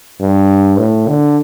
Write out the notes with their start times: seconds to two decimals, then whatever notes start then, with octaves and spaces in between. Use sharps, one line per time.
0.21 G2
0.79 A2
1.08 D3